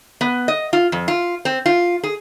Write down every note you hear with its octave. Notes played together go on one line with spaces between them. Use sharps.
B3
D#5
F4
F2
F4
C4
F4
G#4